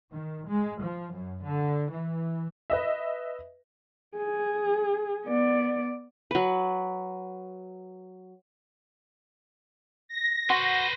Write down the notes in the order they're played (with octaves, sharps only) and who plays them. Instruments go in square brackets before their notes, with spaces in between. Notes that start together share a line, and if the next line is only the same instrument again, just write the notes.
[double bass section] D#3
G#3
F3
F#2
D3
E3
[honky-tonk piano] B4 D#5 E5
[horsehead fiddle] G#4
B3 D5
[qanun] F#3 B4
[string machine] A#6
[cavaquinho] F#4 F#5 C6 [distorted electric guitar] B4 C5